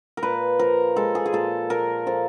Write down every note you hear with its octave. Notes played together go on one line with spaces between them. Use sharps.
A#4
A#2 B4
F3 A#4
G#3 A4
G#4
G#4
A#2 A4
A#2 A#4
F3 A4